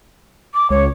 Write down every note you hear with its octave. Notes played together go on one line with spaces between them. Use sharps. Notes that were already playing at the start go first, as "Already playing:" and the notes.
D6
C#2 C#5